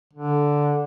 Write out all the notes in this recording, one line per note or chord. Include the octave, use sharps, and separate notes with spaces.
D3